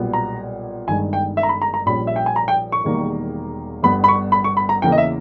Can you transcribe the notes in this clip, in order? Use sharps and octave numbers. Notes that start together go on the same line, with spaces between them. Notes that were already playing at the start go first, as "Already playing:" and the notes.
Already playing: B1 A#2 G3 B3
A#5
G1 G2 D#3 G#3 G#5
G5
E5
A#5
B5
A#5
A#5
A#1 A#2 G3 C#4 B5
E5
G5
G#5
A#5
G5
C#6
E1 E2 D#3 G3 A#3
G1 G2 G3 B3 B5
B5
C#6
B5
C#6
B5
A#5
E2 C#3 E3 A#3 G5
D#5
E5